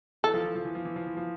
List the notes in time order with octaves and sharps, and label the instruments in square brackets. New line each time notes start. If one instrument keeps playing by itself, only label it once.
[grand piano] E3 [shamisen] A4
[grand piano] F3
E3
F3
E3
F3
E3
F3
E3
F3